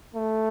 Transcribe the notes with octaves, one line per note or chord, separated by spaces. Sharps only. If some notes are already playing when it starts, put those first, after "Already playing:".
A3